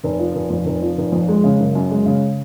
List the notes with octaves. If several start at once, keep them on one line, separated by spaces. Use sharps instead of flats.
F1
F3
F1
F2
F1
F3
F1
F2
G#3
C#3
F#1
F#2
G#3
C#3